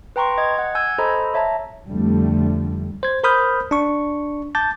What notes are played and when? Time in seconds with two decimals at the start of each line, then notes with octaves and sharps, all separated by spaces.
0.16 B4 G5 A#5 C6 C#6
0.38 D#5 G#6
0.58 F#5
0.75 G#5 E6 G6 G#6
0.98 A4 C5 D#5 A#5 B5
1.34 C#5 E5 A5 A#5
1.87 F2 D3 G3 A3
3.03 C5 G#6
3.23 A#4 C5 B5 D#6 F6 G6
3.71 D4 C#6
4.55 A5 D6 G6 A6